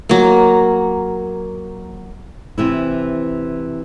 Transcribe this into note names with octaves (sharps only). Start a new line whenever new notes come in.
F#3 A#3
C3 E3 E4